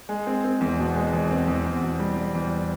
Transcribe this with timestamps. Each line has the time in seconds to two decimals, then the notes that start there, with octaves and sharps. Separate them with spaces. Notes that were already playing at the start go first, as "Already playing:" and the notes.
0.09 G#3
0.27 C4
0.44 C4
0.61 E2
0.79 B2
0.95 G#3
1.13 E2
1.31 C4
1.48 E2
1.65 E2
1.83 B2
1.99 G3
2.17 G3
2.35 E2